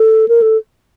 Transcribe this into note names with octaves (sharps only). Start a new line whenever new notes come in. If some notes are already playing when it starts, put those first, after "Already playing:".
Already playing: A4
A#4
A4